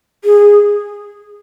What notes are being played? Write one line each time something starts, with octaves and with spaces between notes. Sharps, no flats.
G#4